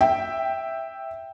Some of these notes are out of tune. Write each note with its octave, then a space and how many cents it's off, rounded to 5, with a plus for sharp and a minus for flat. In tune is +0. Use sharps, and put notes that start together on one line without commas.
E5 +0 G5 +0